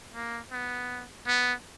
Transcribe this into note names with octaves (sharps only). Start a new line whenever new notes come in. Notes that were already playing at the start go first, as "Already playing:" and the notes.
A#3
B3
B3